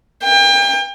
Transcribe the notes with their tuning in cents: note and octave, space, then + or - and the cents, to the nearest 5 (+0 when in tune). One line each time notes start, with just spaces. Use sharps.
G5 +35